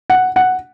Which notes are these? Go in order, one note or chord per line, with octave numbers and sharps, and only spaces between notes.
F#5
F#5